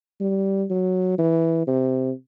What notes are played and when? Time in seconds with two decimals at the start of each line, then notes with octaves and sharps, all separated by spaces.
0.21 G3
0.70 F#3
1.18 E3
1.67 C3